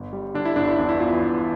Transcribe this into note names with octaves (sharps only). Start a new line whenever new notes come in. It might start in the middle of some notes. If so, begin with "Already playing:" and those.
Already playing: G1
G3
D3 D4
E4
G1 D4
E4
E2 D4
E4
E2 F4
E4
E2